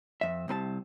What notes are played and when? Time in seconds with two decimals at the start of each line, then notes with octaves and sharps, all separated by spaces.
0.21 F2 E5
0.48 C2 C3 A#4 A5